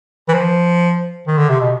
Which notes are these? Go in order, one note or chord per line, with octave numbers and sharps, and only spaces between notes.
E3
F3
D#3
D3
C3
B2